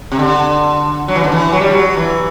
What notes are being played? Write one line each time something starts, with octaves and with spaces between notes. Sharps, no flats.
C3
D3
F#3
E3
D3
E3
F#3
G3
F#3
E3